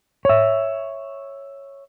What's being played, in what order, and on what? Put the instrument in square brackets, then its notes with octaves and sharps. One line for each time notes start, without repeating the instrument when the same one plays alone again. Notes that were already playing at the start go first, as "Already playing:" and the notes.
[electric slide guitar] C#5 E5